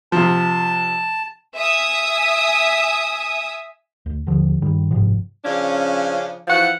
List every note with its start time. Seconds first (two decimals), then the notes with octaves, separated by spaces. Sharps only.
0.12 C3 F3 A5
1.55 E5 G#5 D#6
4.06 D2
4.27 D#2 D3 F3
4.62 G2 D#3 G3
4.91 F#1 G#2 C3 F3
5.44 C#3 F3 C#4 D4
6.48 E3 F3 F#5